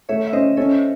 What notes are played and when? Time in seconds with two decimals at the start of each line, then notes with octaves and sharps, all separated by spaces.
0.09 A3 C#5 E5
0.27 E5
0.33 C#4 C5 D#5
0.57 C#4 A4 C#5